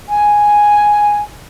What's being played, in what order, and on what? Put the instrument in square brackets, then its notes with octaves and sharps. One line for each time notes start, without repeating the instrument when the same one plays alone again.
[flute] G#5